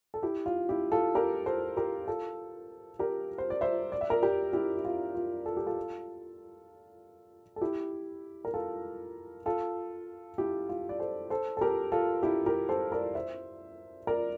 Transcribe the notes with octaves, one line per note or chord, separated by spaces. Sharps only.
A4
E4 G4
F4
E4 G4
F4 A4
G4 A#4
A4 C5
G4 A#4
F4 A4
G4 A#4
C5
D5
C5 E5
D5
E5
A#4 D5
G4 A#4
E4 G4
E4
F4
F4
A4
G4
F4 A4
A4
E4 G4
A#4
F4 A4
F4 A4
E4 G4
F4
D5
A4 C5
A4 C5
A4
G4 A#4
F4 A4
E4 G4
G4 A#4
A4 C5
A#4 D5
C5 E5
A#4 D5